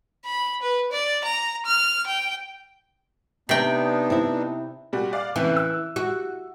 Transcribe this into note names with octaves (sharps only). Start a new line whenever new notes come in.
B5
B4
D5
A#5
F6
G5
C3 B3 D4 D#4 G5
C4 E4
A#2 G3 F#4
D5 F5
A2 C#3 E3 C4
E6
F#4